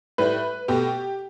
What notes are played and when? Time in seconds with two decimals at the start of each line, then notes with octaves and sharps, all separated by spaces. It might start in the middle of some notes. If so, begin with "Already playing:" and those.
0.18 A2 G3 B4
0.68 B2 A3 G4